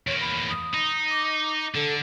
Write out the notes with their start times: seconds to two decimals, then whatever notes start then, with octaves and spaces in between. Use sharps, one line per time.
0.07 E2 A#3 C#5
0.21 B5
0.50 D#6
0.74 D#4
1.11 D6
1.75 D3 A4